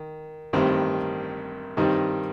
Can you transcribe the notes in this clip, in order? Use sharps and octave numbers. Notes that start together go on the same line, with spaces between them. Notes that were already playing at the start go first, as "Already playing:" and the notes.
Already playing: D#3
A1 G2 D#3 G3 C4
G2 D#3 G3 C4 D#4